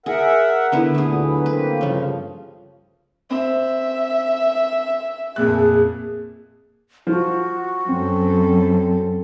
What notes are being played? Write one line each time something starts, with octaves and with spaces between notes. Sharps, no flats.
G#4 A#4 E5 F#5
D3 B3 E4
D2 A#2 A3 B3 G#4
D3 F#3 B4
A#3 C4 B4
G2 C#3 F3
C4 E5
F2 A#2 G#4 F#6
F3 F#4
F#2 C4 A4